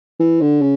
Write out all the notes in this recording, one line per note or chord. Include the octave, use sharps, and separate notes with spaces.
E3
D3
C#3